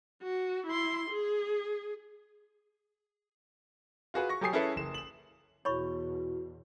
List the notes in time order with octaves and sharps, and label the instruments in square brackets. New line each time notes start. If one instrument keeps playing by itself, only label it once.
[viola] F#4
E4 C6
G#4
[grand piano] F4 F#4 G#4 B4 F#5
C#6 A#6
F#3 G4 A4 G#5 D#6 C7
C#4 E4 G#4 A4 B4 E5
F#1 E7
E7 F#7
[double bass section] E2 B2 [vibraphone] E4 F#4 [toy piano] C#5 B5 C#6